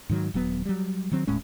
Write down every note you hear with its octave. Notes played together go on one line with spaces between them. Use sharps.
G#2 D#3 F#3
D#1 F#3 B3
F#3 G3
D#3 F#3 C4
D#1 A2 G#3 C#4